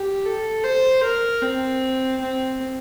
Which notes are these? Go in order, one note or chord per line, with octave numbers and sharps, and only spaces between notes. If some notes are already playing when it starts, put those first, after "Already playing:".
Already playing: G4
A4
C5
A#4
C4
C4